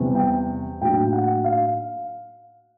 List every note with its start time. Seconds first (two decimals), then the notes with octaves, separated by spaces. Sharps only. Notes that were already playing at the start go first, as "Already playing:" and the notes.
Already playing: E2 C3 E3 G3
0.15 G5
0.81 A2 F#3 A#3 D4 G5
1.13 F#5
1.44 F5